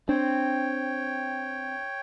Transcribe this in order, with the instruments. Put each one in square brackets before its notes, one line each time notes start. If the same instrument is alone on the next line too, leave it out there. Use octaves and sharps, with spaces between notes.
[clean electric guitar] C4 [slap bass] D4 [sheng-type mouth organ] C#5 G5